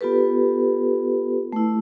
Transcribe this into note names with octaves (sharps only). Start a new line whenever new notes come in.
B3 F4 G4 A4 B4
A3 E4